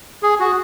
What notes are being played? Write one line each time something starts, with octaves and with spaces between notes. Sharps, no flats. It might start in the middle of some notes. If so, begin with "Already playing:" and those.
G#4
F#4